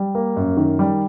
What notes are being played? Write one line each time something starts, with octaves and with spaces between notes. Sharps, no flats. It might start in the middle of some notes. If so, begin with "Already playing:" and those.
Already playing: G3
A#3
F#2
D#3
G3